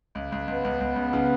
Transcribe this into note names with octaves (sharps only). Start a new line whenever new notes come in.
C#2
C#2
C#2 B3
C#2
C#2
C#2
C#3